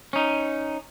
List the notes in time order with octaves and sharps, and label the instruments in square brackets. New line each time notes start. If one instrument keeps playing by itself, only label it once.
[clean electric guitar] C#4 D#4